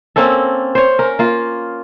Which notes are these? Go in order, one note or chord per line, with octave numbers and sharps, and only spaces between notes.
A#3 C4 C#4 A4
C5 C#5
C#4 A#4
A#3 F4